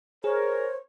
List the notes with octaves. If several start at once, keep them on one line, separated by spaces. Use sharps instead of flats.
G#4 A#4 C5 C#5